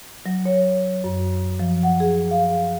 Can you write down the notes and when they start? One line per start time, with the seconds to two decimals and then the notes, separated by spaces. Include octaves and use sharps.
0.26 F#3
0.45 C#5
1.04 F#2
1.59 F3
1.83 F#5
2.00 G#4
2.31 F5